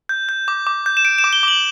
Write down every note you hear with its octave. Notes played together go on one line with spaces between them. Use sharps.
G6
G6
D6
D6
G6
E7
G6 D7
E7
D6
G7
D6 F#7